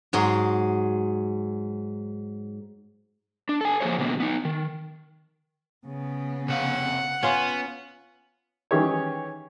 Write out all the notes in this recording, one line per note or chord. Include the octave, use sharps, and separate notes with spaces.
G#2 F#3 G#4 C6
D4
A4 G#5
F3 A#3 G#4 C5 C#5
B2 D3 D#3 F#3 A#3 B3
B3 D#4
D#3
C#3 B3
C3 F5 F#5
B3 C#4 F4 F5
D#3 E3 C#4 G4 G#4 C#5